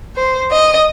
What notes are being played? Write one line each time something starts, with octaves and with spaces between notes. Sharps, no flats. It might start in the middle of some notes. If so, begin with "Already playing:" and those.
C5
D#5